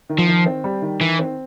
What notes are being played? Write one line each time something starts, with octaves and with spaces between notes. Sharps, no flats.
D#3
F3
D#3
C4
G3
D#3
D#3 E3
C4